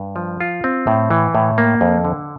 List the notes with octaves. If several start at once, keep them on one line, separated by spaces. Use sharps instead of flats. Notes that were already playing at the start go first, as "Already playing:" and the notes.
Already playing: G2
F3
F4
C4
A2
E3
A2
A#3
F2
D3